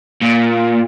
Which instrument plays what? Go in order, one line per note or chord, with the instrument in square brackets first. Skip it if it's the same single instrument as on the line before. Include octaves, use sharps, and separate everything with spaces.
[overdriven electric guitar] A#2